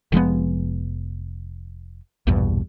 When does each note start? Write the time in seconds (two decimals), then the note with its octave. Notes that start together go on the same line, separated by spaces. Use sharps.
0.12 F1 F3 G#3 B3
2.27 A#1 E2 G2 B2